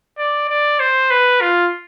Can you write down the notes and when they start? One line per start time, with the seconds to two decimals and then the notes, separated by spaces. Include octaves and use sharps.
0.18 D5
0.49 D5
0.80 C5
1.11 B4
1.41 F4